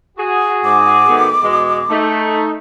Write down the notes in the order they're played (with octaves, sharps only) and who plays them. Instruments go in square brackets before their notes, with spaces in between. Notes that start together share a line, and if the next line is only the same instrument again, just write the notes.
[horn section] F#4 G#4
[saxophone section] G#2 [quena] D6
[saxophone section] D#3 A3 B3
E2 B2 G#3
[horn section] A3 [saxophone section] D#4